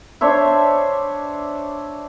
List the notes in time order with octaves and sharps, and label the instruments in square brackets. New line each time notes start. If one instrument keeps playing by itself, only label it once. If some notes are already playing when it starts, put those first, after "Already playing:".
[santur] D4 C5 C#5 E5